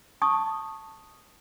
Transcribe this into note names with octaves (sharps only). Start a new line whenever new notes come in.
A5 C#6 D#6